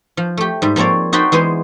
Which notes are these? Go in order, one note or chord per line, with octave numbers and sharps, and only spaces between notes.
F3
A3 G4
G#2 G3
F3 A#3 C4 C#5 D5
D#4 F#4 C5 D5 G5 B5
E3 G#3 B3 C5